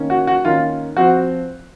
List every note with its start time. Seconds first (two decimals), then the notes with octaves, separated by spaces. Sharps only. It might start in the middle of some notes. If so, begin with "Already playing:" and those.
Already playing: D#3 A#3 C#4
0.10 F#4
0.27 F#4
0.45 D#3 A#3 C#4 F4
0.96 F3 C4 F#4